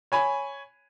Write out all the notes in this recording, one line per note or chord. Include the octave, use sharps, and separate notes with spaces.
C#5 G#5 B5